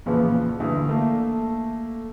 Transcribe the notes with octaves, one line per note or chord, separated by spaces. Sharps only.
E2 A#2 C#3 F3 B3
D2 G2 E3
A3 A#3